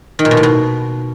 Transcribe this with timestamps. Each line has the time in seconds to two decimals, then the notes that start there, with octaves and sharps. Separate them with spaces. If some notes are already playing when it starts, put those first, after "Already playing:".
0.19 D#3
0.25 A#2
0.31 B2
0.37 A2
0.43 B2